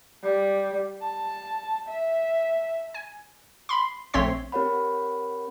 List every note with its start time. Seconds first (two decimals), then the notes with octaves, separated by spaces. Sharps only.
0.23 G3
1.02 A5
1.88 E5
2.94 G#5
3.69 B5 C6
4.13 A#1 A3 C4 C#5 C6 B6
4.52 C4 G4 A#4 C#5 F#5 B5